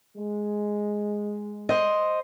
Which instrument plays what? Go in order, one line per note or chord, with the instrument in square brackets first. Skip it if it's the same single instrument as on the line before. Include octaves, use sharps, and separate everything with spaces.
[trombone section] G#3
[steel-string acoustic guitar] C5 D#5